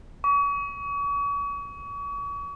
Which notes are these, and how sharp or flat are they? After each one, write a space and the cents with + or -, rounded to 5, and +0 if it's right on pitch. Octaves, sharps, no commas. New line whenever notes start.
C#6 +40